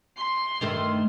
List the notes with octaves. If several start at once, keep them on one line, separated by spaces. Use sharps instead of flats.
C6
G2 D#3 A3